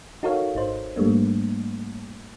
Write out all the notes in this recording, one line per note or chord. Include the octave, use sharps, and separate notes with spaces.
D#4 F#4 A4 A#4 C#5 F5
G#1 D#4 C5
G#2 G3 A3 A#3 D4